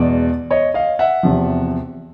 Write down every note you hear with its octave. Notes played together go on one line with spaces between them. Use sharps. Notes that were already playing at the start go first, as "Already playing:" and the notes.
Already playing: E2 B2 G#3 D5
C#5 D#5
D#5 F5
E5 F#5
E2 C3 F3